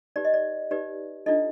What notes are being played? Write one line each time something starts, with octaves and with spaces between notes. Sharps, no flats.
D#4 G4 B4 D5
D#5
D5
D#4 G4 B4 D5
D4 D#4 F4 A4 D#5